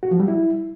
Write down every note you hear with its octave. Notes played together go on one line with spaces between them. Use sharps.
F#4
F3
G3
E4